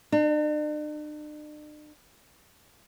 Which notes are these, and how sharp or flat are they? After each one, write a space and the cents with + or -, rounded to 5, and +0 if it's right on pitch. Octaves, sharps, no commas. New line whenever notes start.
D4 +45